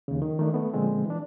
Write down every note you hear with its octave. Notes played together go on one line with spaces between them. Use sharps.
D#2 C#3
D#3
D#3 A3 D4
A3 B3
A#2 D3 F3 G#3 C4
E3 D4